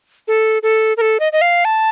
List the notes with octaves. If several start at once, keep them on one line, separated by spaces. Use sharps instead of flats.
A4
A4
A#4
A4
D#5
D#5
F5
A5